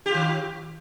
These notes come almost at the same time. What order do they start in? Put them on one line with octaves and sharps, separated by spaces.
G4 F4 D#3